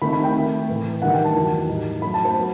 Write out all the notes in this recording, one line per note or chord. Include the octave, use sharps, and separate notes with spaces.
D#3 A3 C4 D#4 B5
B5
G5
D#3 A3 C4
A2 E3 A3
G2 D#3 A3 D#4 F#5
G5
A5
E2 D#3 F#3
A2 G3 D#4
F#2 F#3 A3 D#4 B5
A5
C5
F#3 B3